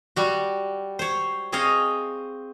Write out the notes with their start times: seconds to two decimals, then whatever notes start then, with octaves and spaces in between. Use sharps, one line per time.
0.16 G3 F#4
0.99 C5 C#5
1.52 C4 G#4 C#5 D#5 F5